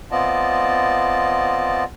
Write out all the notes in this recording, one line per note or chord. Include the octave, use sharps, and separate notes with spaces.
B3 C4 F4 D5 D#5 A5